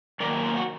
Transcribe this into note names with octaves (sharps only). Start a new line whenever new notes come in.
F#2 D#3 F#3 A#3 A#4 D5
F4
F#4